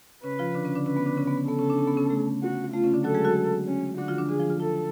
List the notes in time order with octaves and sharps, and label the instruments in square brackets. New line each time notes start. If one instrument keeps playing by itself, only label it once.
[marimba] C#3 C#4 [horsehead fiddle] B4
[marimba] F3 F4
D3 D4
C#3 C#4
D3 D4
[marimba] C#3 C#4 [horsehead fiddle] B4
[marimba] B3
D3 D4
C#3 C#4
B3
B3
[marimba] B3 [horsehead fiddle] A4
[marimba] C#3 C#4
D4
C#4
B3
C#3 C#4
A3
[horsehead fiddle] F#4
[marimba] A3 [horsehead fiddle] F4
[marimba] C#3 C#4
D3 D4
[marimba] F#3 F#4 [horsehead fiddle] A4
[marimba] G#3 G#4
F#3 F#4
[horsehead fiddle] C#4
[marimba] D3 D4 [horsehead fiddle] F#4
[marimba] F3 F4
D3 D4
[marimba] D3 D4 [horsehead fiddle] G#4
[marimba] F3 F4
F3 F4
[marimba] F3 F4 [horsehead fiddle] A4